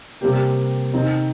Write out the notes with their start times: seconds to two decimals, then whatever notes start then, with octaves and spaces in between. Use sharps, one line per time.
0.21 C3 G3 A#3 G4
0.94 C3 D#3 C4 D#4